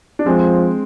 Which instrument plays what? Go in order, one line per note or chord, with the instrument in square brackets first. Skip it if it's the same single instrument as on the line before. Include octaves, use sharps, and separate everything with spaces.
[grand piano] D4
[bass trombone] F3 [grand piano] G#3 C4